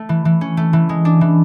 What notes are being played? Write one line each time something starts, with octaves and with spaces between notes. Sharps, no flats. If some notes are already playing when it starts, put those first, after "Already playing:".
Already playing: A3
E3
E3
C#4
A3
E3
G#3
D4
E3